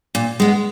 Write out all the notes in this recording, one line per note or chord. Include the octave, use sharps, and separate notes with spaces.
A#2
G#3 B3